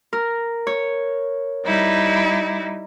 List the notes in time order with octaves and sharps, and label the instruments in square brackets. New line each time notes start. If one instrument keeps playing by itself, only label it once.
[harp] A#4
C#5
[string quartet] G3 D#4 E4